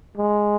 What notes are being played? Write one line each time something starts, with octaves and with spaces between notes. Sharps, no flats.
G#3